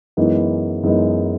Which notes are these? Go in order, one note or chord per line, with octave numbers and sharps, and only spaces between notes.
F#2 E3 G#3 B3 D#4
F#2 E3 G#3 B3 D#4